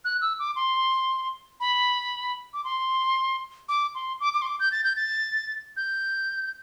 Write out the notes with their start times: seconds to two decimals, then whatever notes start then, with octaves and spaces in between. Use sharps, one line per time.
0.05 F#6
0.21 E6
0.39 D6
0.56 C6
1.60 B5
2.53 D6
2.64 C6
3.69 D6
3.95 C6
4.20 D6
4.33 D6
4.42 C6
4.47 D6
4.60 G6
4.72 A6
4.84 G6
4.96 A6
5.77 G6